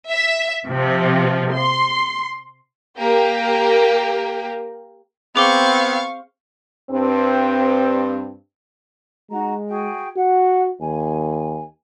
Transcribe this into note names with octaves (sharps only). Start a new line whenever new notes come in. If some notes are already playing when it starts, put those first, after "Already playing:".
E5
C3 F3
C6
A#3 G4 A#4
B3 C4 G#4 F5 C#6 D6 G7
G2 C4
G#3 D#4 F#4 A#5
F#4 G#4 G5
F#4 F#5
D#2 G#5